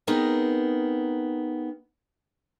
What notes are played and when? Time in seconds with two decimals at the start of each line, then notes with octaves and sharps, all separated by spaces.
0.07 B3 C4 D#4 G#4 A#4